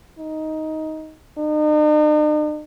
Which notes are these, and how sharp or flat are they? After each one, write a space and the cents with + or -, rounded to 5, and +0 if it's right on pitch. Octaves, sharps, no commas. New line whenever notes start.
D#4 +10
D#4 -45